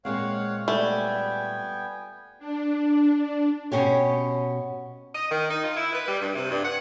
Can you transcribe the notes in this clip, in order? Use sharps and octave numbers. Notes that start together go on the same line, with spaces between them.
A#2 G#3 C4 C#5 F5 F#5
G3 A3 B3 G5 G#5
D4
D4
B2 C#4 G4 C#5
D#5
D#3
D#4
F4
E4
B4
G3
G2
C3
G2
F#5